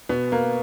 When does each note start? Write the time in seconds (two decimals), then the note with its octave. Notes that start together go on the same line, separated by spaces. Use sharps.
0.09 B2 B3
0.32 A#3